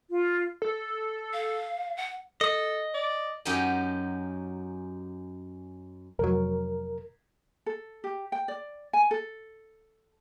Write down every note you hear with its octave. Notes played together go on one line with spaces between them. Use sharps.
F4
A4
F5
F#5
A4 D#5
D5
F#2 F#3 C#4 D#4 G4 D#5
F1 F#3 A#4
A4
G4
G5
D5
G#5
A4